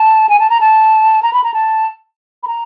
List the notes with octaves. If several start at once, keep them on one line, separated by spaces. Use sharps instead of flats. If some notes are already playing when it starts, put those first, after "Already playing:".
Already playing: A5
G#5
A5
A#5
A5
A#5
B5
A#5
A5
B5
A#5